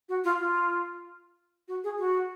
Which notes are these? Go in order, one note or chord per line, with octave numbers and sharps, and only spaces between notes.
F#4
F4
F4
F#4
G#4
F#4